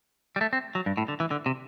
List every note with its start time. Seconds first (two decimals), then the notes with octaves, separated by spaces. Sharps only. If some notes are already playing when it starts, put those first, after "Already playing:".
0.36 G3
0.41 A3
0.53 C4
0.75 F#3
0.86 G2
0.97 A2
1.08 D3
1.20 E3
1.31 D3
1.46 C3